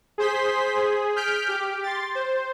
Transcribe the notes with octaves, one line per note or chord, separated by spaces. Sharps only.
G#4 C5 C6 B6
G#4
F6 G6 B6 D7
G4
C6 A6
C5